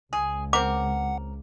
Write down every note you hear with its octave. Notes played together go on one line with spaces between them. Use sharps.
C#2 G#4
C4 A#4 F#5 D6